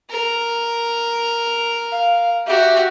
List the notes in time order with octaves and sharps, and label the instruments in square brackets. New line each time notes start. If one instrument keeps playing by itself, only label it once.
[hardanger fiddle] A#4
[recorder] F5
[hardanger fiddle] F#4 G4 [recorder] E5